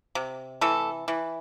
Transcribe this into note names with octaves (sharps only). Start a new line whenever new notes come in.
C3
E3 A3 A4
E3